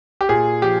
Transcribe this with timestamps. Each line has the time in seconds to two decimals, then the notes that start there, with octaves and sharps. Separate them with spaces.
0.21 G4
0.29 A#2 G#4
0.62 F3 G4